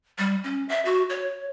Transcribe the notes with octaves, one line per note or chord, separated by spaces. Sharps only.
G3
C#4
E5
F#4
C#5